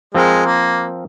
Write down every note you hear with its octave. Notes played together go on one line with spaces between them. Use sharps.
F3 G#3 C4 A#4
A#3